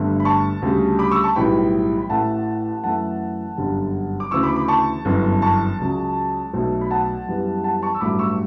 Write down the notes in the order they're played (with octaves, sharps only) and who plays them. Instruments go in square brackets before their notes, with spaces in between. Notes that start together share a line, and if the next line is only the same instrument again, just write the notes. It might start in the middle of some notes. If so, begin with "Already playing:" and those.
Already playing: [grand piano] G1 G2 D3 A3
B5
A5 C#6
D2 C#3 G3
B5 D6
C#6 E6
A5 C#6
B1 A2 E3 G3 B3 G5 B5
B5
A1 A2 E3 A3 F#5 A5
F#2 E3 A3 F#5 A5
G1 F#2 D3 G3
D6
D2 C#3 E3 C#6 E6
B5 D6
B5 D6
A5 C#6
G1 F#2 E3 B3
A5 C#6
C#2 C#3 F#3
B1 B2 A3
B5
F#5 A5
F#2 E3 G3 B3
F#5 A5
A5 C#6
E6
A1 G2 F#3 A3 B5 D6
C#6 E6